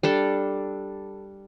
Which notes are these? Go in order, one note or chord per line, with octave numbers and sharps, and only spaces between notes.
G3 D4 A4